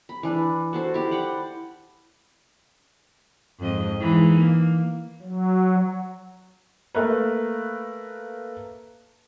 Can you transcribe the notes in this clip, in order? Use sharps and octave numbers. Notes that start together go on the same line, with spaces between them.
B5
E3 D4
F#4 A4 C5
E4 G4
D5 F#5 G5
F2 G#2 D#5
E3 G#3 D#4
A#3
F#3
A3 A#3 A#4 B4